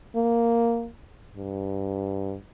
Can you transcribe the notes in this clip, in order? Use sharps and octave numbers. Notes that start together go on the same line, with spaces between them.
A#3
G2